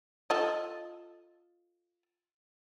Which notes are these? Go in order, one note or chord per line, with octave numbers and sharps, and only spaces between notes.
F4 A4 D#5